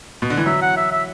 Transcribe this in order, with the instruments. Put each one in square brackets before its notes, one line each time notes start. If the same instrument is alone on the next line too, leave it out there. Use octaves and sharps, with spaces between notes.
[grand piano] B2
D3
E3
[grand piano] F#3 [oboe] E5
[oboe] F#5
E5
E5